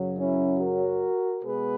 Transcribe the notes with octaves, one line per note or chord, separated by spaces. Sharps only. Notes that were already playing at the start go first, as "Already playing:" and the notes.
Already playing: F#2 C#3 F#3
C#4 E4
F#4 A#4
B2 G#3 B3 G#4 B4